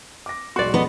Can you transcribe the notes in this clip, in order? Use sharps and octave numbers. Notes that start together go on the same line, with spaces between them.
D6 A#6
E1 B1 F#4 D5 C6
B3 A4 D#5